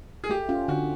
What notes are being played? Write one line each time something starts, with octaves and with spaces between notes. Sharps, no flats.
G#4
A3 G4
C#4 F4
D3 F#4